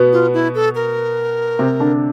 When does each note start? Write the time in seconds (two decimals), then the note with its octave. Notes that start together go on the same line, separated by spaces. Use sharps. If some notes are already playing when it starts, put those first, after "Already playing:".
Already playing: B2 B3
0.12 F4
0.34 E4
0.55 A4
0.75 A#4
1.59 C3 C4
1.80 D3 D4